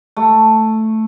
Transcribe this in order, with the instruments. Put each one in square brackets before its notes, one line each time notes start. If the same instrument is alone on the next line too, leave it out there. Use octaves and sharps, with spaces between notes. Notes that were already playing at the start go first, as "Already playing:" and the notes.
[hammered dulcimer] A3